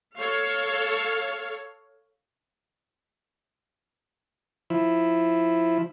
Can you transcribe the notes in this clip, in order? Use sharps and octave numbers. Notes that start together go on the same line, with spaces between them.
A4 C#5 F5
F3 E4